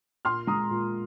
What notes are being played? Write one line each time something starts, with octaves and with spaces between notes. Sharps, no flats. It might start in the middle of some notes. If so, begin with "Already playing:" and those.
A#2 C6 F6
G#3 A#5 D#6
A#2